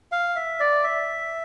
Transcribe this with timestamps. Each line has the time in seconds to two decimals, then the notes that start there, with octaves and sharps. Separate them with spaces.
0.12 F5
0.36 E5
0.60 D5
0.84 E5